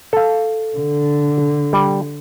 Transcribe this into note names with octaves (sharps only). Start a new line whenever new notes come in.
A4 F5
D3
G3